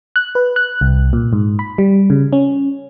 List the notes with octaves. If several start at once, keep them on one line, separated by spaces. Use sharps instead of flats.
F#6
B4
F#6
C2
A#2
G#2
B5
G3
C#3
C#4